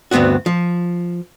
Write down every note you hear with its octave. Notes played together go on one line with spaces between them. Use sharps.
D2 G2 B3 C4 F#4
F3